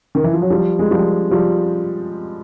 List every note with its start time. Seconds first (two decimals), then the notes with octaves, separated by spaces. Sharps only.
0.15 D#3
0.24 E3
0.33 F3
0.42 F#3
0.50 F3 G3
0.79 G#3
0.91 F3 G3
1.31 F3 G3